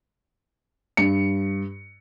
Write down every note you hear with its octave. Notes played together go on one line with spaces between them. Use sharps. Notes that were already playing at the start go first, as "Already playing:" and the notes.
G2 C#7